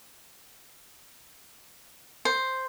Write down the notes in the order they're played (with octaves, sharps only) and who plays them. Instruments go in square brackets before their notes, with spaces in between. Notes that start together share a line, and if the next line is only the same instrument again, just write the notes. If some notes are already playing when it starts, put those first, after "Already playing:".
[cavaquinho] C5